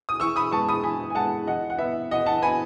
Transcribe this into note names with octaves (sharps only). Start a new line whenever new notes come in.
D#6
E3 C#6 E6
B5 D#6
G#3 B3 A5 C#6
B5 D#6
E3 G#5 B5
G#5
G#3 B3 F#5 A5
E3 D#5 F#5
F#5
B3 E5
E3 D#5 F#5
F#5 A5
B3 G#5 B5